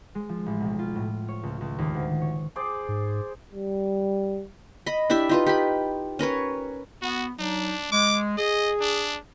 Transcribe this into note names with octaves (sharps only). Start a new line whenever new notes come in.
G#3
F3
A1
B1
F4
A2
C#5
C#2
C#2
D#2
D2
C#5
G#4 C5 D5
G#2
G3
D#5 B5
D4 E4 G4 E5
D#4 F4 B4
G4 B5
C#4 A#4 B4 C#5
B3 F#4
F#3 D4 D#4
G#3 D6
G#4 D#5
D4